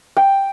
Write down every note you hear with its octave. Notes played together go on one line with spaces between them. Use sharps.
G5